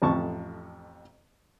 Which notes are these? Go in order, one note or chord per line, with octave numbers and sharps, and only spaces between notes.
A1 F2 A5 C#6